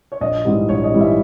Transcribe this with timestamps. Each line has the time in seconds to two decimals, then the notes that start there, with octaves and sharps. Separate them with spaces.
0.12 C#5
0.21 A#1 D#5
0.45 G#2 E3 G3
0.69 A#1 C#5
0.84 D#5
0.92 G#2 E3 G3
1.01 E5